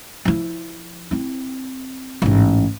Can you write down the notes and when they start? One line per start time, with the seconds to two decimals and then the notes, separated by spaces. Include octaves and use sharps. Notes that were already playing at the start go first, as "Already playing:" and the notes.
0.25 F3 E4
1.11 C4 E4
2.22 A1 G#2